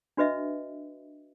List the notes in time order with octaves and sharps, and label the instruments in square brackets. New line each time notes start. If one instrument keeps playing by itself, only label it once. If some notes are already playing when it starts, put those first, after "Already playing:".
[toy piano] D4 F#4 B4 D#5 E5